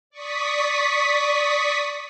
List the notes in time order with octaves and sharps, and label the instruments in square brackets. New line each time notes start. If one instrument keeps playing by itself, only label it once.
[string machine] D5 C#6 D#6 B6